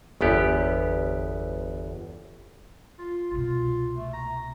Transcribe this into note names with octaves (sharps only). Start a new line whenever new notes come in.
G1 E2 B3 G4
F4
C2 B2 F4
A3
A#5